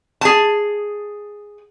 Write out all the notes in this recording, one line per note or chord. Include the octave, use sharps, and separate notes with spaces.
G#4 A5